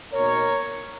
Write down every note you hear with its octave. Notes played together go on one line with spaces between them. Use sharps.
B2 A#3 D#4 A#4 C#5